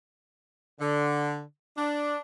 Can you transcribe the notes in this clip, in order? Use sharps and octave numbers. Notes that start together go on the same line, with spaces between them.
D3
D4